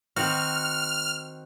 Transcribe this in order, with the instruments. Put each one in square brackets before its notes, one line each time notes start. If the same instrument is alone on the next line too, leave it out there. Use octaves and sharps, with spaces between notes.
[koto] D#3 C4 F#4 [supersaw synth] F6